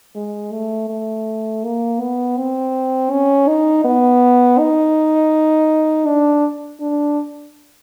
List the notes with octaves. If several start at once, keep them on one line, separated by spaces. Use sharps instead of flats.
G#3
A3
A3
A#3
B3
C4
C#4
D#4
B3
D#4
D4
D4